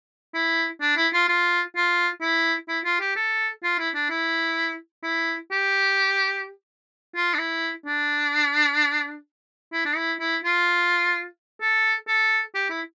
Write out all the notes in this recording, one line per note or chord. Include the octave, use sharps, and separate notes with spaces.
E4
D4
E4
F4
F4
F4
E4
E4
F4
G4
A4
F4
E4
D4
E4
E4
G4
F4
D4
E4
D4
E4
D4
E4
E4
F4
A4
A4
G4
E4